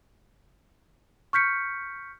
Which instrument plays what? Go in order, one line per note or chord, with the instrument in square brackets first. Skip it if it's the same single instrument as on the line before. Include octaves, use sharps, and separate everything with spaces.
[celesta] C#6 F6 G6 B6 C#7